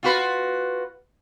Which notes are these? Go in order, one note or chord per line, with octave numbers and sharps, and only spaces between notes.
F4 F#4 B4